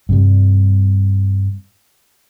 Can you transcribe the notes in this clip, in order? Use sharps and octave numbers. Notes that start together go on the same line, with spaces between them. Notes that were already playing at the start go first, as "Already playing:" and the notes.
G2 C3 G3